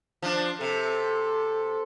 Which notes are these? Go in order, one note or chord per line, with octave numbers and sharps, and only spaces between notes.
F3 D4
C3 A4